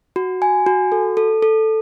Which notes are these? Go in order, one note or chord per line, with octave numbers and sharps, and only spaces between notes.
F#4
G#5
F#4
A4
A4
A4